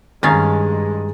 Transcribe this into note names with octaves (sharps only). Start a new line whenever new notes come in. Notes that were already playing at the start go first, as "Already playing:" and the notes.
G2 D#3 G#3 C#4 F5 A#5 D#6 A6